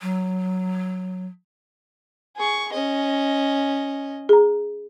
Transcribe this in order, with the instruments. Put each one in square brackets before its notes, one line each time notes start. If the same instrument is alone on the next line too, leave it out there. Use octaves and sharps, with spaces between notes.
[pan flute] F#3
[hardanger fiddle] G#4 C#6
C#4 D#5
[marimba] G#4 A#5